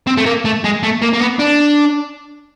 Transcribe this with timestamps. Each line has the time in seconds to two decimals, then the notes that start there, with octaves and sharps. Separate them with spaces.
0.07 C4
0.18 A3
0.26 A#3
0.45 A3
0.64 G#3
0.83 A3
1.02 A#3
1.13 A#3
1.20 B3
1.39 D4